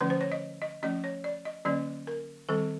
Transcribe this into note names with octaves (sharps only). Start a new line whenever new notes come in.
D3 F3 A3 C#4 B4
C5
C#5
D#5
D#5
F3 A3 C#4 D#5
C#5
D5
D#5
D3 F#3 A#3 C#4 D5
A#4
D#3 G3 C4 A4